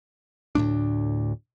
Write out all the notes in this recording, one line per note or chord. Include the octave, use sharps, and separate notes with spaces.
D2 A2 A3 D4